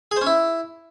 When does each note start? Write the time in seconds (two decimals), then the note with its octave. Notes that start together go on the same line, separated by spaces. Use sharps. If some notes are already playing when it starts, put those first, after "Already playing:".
0.11 G#4
0.16 C5
0.21 C#4
0.26 E4